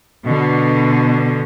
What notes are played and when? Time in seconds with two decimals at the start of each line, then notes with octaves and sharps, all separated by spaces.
0.25 B2 D3